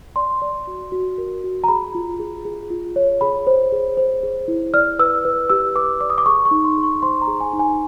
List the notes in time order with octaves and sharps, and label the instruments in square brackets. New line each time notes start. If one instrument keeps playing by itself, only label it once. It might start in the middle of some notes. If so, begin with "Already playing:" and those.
[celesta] D5 C6
D5
F#4
F#4
A#4
F#4
A#5
G#4 B5
F4
G#4
G#4
F4
C#5
G#4 B5
C5
G#4
C5
G#4
E4
D5 F6
B4 E6
B4
G4 E6
B4 D6
D5 D6
D#6
D6
G#4 C#6
C#6
D#4
C6
G#4
C#6
C5 C6
A#5
G#4
G#5
D#4
G#5